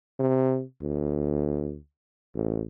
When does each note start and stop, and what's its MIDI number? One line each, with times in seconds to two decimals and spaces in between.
0.19 0.63 48
0.82 1.78 38
2.35 2.63 33